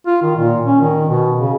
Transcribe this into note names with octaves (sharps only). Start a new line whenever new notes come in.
F4
D#3
A#2
C#4
D#3
B2
C#3